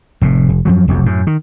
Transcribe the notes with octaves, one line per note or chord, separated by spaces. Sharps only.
F1 A2
F1
F#2 F3 F#3
F1 B1 F2
F#2 A2
D#3